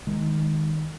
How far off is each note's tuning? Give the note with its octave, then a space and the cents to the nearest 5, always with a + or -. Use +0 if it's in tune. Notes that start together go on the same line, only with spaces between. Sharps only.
D#3 +0 G#3 +0